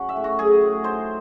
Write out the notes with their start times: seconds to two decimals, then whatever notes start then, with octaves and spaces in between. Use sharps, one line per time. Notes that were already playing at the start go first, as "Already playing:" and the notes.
Already playing: F#3 C#4 F#5
0.09 E5
0.16 A2
0.24 F#4
0.39 F#3 G#4
0.61 A2
0.84 D#4 C5